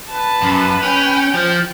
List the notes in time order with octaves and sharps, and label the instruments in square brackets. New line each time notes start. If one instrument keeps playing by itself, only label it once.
[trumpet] B4 [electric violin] A5
[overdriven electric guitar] F#2
[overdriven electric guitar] C#4 [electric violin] G5
[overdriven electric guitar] F3